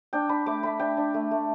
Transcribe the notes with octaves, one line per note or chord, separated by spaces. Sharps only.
D4 G5
D4 B5
A3 D6
A3 B5
D4 G5
D4
A3
A3